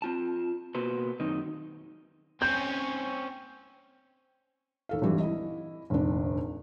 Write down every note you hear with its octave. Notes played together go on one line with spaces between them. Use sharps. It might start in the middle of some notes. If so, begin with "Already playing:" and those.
C4 F4 A5
B2 A#3 F#4 B4 C5
F#2 D#3 C4 D#4 D#5
C4 C#4 G6
D#2 A4 F5
G#1 G2 E3 G3
E4 D#5
F1 A#1 D#2 D4